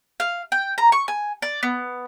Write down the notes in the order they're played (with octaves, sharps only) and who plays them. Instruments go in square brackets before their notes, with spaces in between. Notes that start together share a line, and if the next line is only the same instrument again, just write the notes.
[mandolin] F5
G5
A#5
C#6
G#5
D5
B3